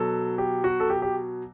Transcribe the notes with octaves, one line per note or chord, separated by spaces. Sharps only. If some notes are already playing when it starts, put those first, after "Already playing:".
Already playing: B2 F#3 A4
G4
F#4
A4
G4
G4